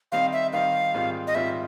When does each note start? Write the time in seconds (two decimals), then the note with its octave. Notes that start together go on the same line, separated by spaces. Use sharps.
0.12 D#3 G3 C4 D#4 F5
0.33 E5
0.53 D#3 G3 C4 D#4 F5
0.94 G#2 D#3 G3 C4 F4
1.27 D#5
1.35 G#2 D#3 G3 C4 F4 E5